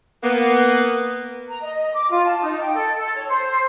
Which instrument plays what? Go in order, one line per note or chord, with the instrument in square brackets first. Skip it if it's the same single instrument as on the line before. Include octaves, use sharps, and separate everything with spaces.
[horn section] A#3 B3
[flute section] A#5
D#5
D6
F4
A5
D#4
G5
A4
A4
C#5
C5